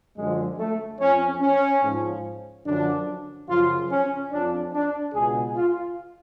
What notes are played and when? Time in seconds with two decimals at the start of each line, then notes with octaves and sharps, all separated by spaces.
0.17 F#2 D3 F3 G#3
0.59 A3
1.00 F2 F3 C#4
1.41 C#4
1.83 G#2 F3
2.65 F#2 D3 F3 D4
3.49 F#2 C#3 F3 F4
3.90 C#4
4.31 F2 F3 D4
4.73 D4
5.14 C#2 B2 G#4
5.56 F4